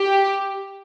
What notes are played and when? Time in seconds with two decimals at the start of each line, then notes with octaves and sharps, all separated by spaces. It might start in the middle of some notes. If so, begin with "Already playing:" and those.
Already playing: G4